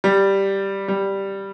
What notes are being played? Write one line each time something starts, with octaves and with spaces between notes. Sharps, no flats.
G3
G3